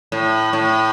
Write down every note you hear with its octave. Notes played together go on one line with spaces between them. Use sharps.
A2
A2